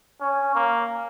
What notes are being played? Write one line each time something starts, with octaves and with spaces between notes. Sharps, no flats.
C#4
A#3